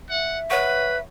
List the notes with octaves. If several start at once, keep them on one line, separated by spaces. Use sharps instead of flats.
E5 F#5
B4 C#5 F#5 B5 C#6